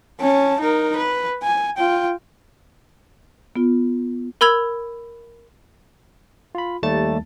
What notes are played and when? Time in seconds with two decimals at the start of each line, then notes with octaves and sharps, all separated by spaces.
0.20 C#4 A5
0.60 D#4 A#4
0.96 B4
1.43 G#5
1.78 F4 G5
3.56 B3 F4
4.41 A#4 B5 E6 G#6 F7
6.55 F4 B5
6.83 D#2 G3 A3 A5 A6